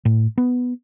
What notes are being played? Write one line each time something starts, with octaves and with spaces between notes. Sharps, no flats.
A2
B3